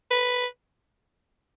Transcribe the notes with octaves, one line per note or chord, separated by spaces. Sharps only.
B4